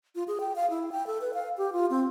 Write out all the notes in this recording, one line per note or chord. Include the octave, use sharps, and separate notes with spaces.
F4
G#4
G5
F5
E4
G5
A4
B4
F5
G4
F4
C4